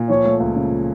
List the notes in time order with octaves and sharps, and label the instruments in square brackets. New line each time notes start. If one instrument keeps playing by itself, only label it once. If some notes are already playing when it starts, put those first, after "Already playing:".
Already playing: [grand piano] A#2
[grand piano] F3 [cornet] C#5
[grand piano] A3
C#2
C#3